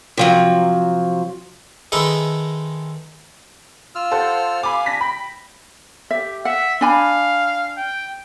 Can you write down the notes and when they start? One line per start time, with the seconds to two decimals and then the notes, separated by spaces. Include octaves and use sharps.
0.17 C3 F3 F#3
1.92 D#3 G#3 A4 B4 D#5 E5
3.95 F4 E6 F6
4.12 A4 C5 F#5
4.63 F5 G#5 B5 D6
4.86 D4 G#5 A#6 B6
5.01 G5 B5
6.11 G4 E5
6.45 E5 F#5
6.81 D4 F5 G#5 B5
7.77 G5